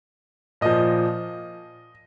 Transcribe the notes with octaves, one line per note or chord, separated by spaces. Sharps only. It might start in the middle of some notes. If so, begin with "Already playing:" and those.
A#2 F3 D#5